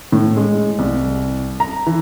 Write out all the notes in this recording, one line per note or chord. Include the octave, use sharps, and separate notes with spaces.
A2
G#3
C2
A#5
E3